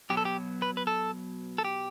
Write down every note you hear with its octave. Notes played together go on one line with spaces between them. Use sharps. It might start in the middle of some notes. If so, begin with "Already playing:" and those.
B1 B2 F#3 G4
A4
G4
B4
B4
A4
A4
G4